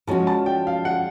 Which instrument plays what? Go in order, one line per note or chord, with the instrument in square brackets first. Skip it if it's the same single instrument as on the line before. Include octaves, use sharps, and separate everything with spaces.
[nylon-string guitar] F3 G#3 C#4 F#4 [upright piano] A5
[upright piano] A5
G5
F5
F#5